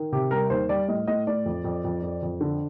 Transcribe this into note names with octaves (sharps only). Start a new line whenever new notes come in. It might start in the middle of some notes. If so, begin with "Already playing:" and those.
Already playing: D#3
C3 G4
G3 A#4
D#2 C5
G3 D5
A2 D#5
A2 D#5
A2 D5
F2
F2
F2
F2
F2
D3